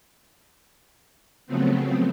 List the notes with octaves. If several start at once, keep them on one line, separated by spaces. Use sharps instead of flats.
C#3 F3 F#3 A3 B3 C4